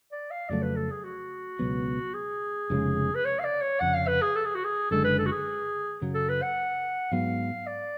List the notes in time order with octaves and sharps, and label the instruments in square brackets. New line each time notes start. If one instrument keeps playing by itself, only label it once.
[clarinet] D5
F5
[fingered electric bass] F2 C#3 F#3 A3 [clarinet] D5
[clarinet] B4
A4
G#4
F#4
[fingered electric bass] C#2 B2 F#3 B3
[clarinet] G#4
[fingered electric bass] F1 F2 C#3 G#3
[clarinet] B4
C#5
F5
D5
C#5
[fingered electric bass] F1 F2 C#3 [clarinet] F#5
[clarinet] F5
B4
G#4
A4
G#4
F#4
G#4
[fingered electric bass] F#1 F#2 D3 G#3 [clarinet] A4
[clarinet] B4
A4
F#4
G#4
[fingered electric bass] F#2 C#3 F#3
[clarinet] A4
B4
F#5
[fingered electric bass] G#2 F#3 B3 [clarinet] F5
[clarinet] D5